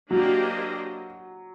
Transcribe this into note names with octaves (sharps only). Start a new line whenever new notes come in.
F#3 A#3 D4 G4 C5 D#5